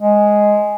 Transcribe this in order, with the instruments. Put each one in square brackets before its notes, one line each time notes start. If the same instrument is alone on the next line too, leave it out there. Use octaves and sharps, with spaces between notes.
[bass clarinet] G#3